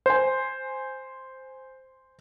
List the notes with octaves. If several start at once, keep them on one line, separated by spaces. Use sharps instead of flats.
C5 G#5